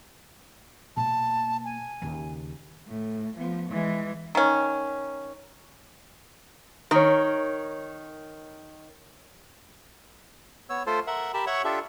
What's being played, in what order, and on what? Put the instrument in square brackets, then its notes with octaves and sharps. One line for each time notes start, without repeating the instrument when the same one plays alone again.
[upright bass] B2 A#3 [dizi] A5
[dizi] G#5
[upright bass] D#2 C#3
[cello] A2
F3 B3
E3 G#3
[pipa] D#3 C#4
[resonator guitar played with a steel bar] D#3 [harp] A#4 C#5
[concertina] B3 C#5 E6
A3 F4 A4 C5
A#4 E5 F#5
G4 A#4 A5 B5
C#5 E5 F#5 C#6
D4 F4 G4 A4 E5